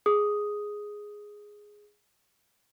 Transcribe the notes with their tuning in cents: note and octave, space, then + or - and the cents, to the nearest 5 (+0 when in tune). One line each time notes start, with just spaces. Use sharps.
G#4 +0 D#6 +0